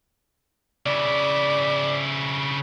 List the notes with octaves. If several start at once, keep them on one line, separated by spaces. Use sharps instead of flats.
C#3 E4 D5